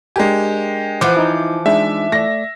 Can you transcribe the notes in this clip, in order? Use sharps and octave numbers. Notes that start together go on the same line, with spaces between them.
G#3 D4 G4 A#4 G#5
E3 F3 C5 F#5 D6
D#4 E4
G#3 D4 D#4 E5
A3 D5 A#6